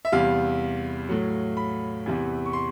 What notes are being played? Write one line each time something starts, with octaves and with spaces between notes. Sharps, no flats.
E5
E2 C3 E3 G3 F5
A2 F#3
B5
E2 C3 E3
C#6
C6